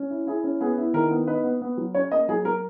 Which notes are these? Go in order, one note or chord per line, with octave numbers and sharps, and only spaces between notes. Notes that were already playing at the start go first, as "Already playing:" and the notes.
Already playing: C#4
E4
E4 G#4
C#4
B3 G#4
E4
D#3 A#4
B3
D#4 B4
B3
B3
F#3
C#4 C#5
A#3 D#5
F#3 G#4
F#3 A#4